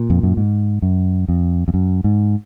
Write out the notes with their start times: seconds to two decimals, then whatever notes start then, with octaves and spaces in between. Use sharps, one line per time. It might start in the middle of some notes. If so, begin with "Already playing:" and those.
Already playing: A#2
0.10 F2
0.23 F#2
0.37 G#2
0.82 F#2
1.29 F2
1.68 F2
1.74 F#2
2.04 G#2